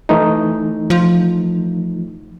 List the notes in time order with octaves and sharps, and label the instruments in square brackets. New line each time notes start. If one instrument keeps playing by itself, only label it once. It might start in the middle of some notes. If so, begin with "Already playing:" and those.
[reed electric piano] E3 A3 D#4
[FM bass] F3